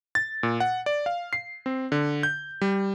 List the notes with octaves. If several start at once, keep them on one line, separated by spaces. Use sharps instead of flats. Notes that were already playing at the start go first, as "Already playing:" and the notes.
A6
A#2
F#5
D5
F5
C7
C4
D3
G6
G3